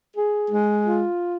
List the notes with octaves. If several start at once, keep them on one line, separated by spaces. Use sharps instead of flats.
G#4
G#3
F4